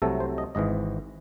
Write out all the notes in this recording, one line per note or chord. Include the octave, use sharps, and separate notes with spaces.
C2 C3 F#3 A3 A4
C5
D#5
G#1 G#2 E3 D#5